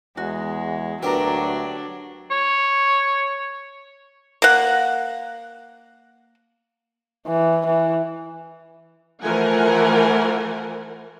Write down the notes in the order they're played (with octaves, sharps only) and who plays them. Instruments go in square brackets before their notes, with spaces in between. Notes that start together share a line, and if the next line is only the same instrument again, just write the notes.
[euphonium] E2 [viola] G#3 [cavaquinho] F#4
[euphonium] D2 [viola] F#3 D4 [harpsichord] B3 A4 A#4 [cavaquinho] G4 A#5
[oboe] C#5
[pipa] A#3 F#5
[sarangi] E3
E3
[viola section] E3 F3 A3 A#4 F#5 G#5